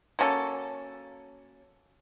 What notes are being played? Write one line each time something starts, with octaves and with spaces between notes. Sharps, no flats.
F#3 A#3 C#4 A4